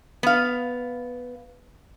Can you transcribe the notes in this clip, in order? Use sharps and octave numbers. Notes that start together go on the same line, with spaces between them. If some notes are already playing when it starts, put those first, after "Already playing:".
B3 F5